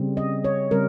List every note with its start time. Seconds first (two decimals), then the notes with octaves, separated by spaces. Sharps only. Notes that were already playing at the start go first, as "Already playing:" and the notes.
Already playing: C#3 G3 C4
0.17 D#5
0.45 C#5
0.71 C#3 G3 C4 A#4